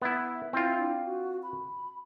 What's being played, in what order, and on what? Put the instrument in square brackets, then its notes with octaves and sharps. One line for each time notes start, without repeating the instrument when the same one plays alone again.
[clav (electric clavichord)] B3 E4 [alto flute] E5
[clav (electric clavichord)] C4 F4 [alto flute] E4
[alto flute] D4
F#4
B5